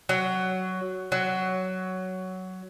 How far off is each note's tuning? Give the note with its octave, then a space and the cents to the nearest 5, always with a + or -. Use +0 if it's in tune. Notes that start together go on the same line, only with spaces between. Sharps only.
F#3 +10
F#3 +10